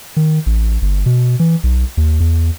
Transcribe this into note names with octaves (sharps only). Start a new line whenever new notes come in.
D#3
A1
G1
B2
E3
B1
D#2
E2